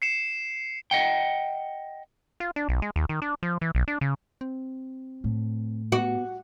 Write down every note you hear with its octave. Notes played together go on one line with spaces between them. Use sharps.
C7 C#7 E7
D#5 F#5 G5
F4
D4
B1
G#3
D#2
D#3
D4
F3
E3
B1
D4
C#3
C4
A2
B3 F#4